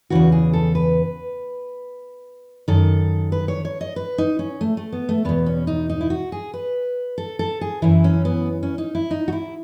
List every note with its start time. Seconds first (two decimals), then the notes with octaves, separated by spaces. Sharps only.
0.10 E2 C#3 E3 F#4
0.32 G#4
0.53 A4
0.75 B4
2.68 F#2 D#3 A4
3.32 B4
3.48 C#5
3.65 C#5
3.81 D#5
3.96 B4
4.18 D#4
4.39 C#4
4.61 A3
4.77 A3
4.92 B3
5.09 A3
5.25 E2 B2 B3
5.46 C#4
5.67 D#4
5.89 D#4
6.01 E4
6.10 F#4
6.32 G#4
6.54 B4
7.18 A4
7.39 A4
7.61 G#4
7.82 F#2 E3 E4
8.04 C#4
8.25 B3
8.63 C#4
8.78 D#4
8.95 E4
9.11 D#4
9.28 F#4
9.33 E4